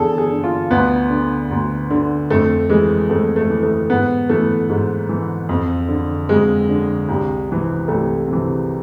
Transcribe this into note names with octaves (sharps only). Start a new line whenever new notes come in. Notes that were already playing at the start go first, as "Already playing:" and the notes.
Already playing: E2 D3 G#4 A4
G#4
D3
F4
D2 B3
D3
D2
D3
F2 A3
E3 G#3
F2 A3
A3
E3
A3
G#2 B3
E3 A3
G#2
E3
F2
D3
F2 G#3
D3
C2
C3 E3
C2 A3
C3 E3